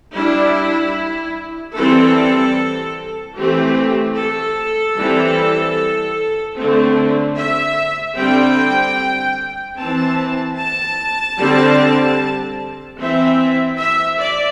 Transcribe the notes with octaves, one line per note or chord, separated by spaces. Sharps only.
G3 D4 E4
E3 G3 C4 A4
E3 A3 C4 G4
A4
E3 G3 C4
D3 A3 C4
E5
D3 G3 C4 G5
E3 C4 A5
A5
D3 G3 C4
E3 C4 E5
E5
D5